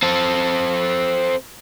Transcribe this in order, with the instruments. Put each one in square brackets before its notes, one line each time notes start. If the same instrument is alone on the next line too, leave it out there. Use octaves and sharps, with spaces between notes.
[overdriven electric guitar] C4 A4